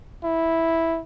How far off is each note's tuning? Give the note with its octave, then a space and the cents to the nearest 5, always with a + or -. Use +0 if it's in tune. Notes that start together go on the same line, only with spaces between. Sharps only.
E4 -5